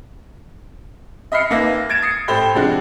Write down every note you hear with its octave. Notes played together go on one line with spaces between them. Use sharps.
D#5 E5 B5 F6 C7 C#7
D#2 A#3 B4 E5 A#6
G#6 A6 D7 E7
D#6 C7 C#7
A1 G4 A4 C5 B5 G7
C3 F3 G3 G#3 D4 F#4